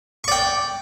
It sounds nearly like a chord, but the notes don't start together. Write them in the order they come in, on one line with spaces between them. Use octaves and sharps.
C#6 D5 G5